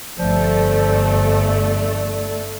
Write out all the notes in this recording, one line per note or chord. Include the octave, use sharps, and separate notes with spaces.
G1 F3 A3 D5